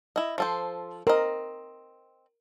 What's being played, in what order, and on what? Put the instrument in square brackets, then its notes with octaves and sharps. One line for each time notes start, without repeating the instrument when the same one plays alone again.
[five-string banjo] E4 D#5
F3 A4 C5
[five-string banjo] C4 D#5 [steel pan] A#4